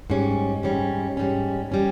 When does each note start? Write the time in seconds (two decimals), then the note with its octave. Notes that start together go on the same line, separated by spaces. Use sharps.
0.10 G#2 G3 C#4
0.63 G#2 G3 C#4
1.17 G#2 G3 C#4
1.72 G3 C#4